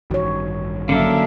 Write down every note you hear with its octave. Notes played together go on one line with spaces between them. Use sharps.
A1 G2 D#3 F#4 C#5
D3 F#3 A#3 C#4 D4 E5 F5